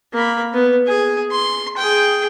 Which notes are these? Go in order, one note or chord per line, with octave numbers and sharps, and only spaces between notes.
A#3 B5
B3
G#4 G#5
C6
G#4 G5